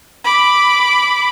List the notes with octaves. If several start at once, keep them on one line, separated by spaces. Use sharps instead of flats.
B5 D6